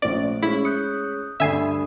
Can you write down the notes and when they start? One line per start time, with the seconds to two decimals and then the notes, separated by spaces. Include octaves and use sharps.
0.02 A#1 A3 C#4 C5 D5
0.43 G#3 C#4 E4
0.65 D#6 F#6 G6 C#7
1.40 D2 G2 E5 G#5 D#6 C7